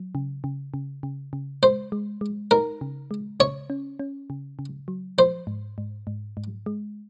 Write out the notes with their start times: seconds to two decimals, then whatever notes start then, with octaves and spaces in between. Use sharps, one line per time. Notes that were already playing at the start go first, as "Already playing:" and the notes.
Already playing: F#3
0.15 C#3
0.44 C#3
0.74 C#3
1.03 C#3
1.33 C#3
1.63 G#3 C5
1.92 G#3
2.21 G#3
2.51 D#4 A#4
2.81 C#3
3.11 G#3
3.40 C#3 C#5
3.70 C#4
3.99 C#4
4.30 C#3
4.59 C#3
4.88 F#3
5.18 F3 C5
5.47 G#2
5.78 G#2
6.07 G#2
6.37 G#2
6.66 G#3